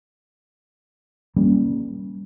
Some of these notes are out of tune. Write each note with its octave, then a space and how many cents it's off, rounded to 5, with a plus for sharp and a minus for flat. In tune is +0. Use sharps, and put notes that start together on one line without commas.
G3 +0 A#3 +10 C#4 +0